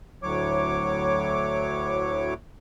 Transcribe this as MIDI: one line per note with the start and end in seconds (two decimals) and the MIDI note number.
0.23 2.34 38
0.23 2.34 45
0.23 2.34 54
0.23 2.34 73
0.23 2.34 86